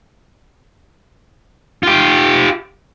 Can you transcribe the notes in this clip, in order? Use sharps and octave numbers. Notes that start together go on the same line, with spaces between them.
F4 G4